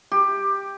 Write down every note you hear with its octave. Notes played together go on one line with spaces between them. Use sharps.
G4